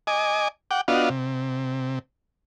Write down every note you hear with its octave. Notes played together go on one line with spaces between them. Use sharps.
D#5 G#5 D6
F#5 G5 D6
B3 D4 F4 F#4 D#5 F5
C3